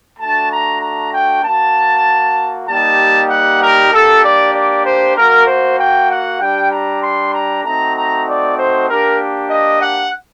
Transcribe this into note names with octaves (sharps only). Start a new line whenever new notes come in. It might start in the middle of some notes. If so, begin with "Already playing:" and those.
A3 D4 F#4 A5
A#5
A#5
G5
A#3 F#4 A5
G3 A#3 D#4 G4 A5
F#5
A#4
A#3 D4 G4 A4
D5
D5
C5
A#3 F#4 A#4
C5
G5
F#5
G3 D4 G4 G5
A#5
C6
A#5
A3 C4 D#4 F#4 A#5
A#5
D5
C5
A#3 D4 G4 A#4
D#5
F#5